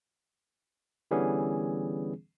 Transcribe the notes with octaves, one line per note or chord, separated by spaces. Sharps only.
D3 E3 G3 B3 C#4 G#4